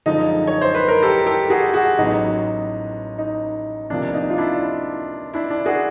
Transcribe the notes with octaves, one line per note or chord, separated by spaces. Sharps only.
F#2 D3 F3 G#3 D#4
C#5
C5
B4
A#4
G4 A4
G4 A4
F#4 G#4
F#4 G#4
A1 A2 F#3 B3 D#4
D#4
C#2 C3 F3 A#3 D4
D#4
F4
D4 E4
D4 E4
D4
F#4 G#4